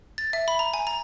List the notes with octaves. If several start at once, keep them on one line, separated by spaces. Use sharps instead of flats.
A6
E5
B5
A#5
G#5
A#5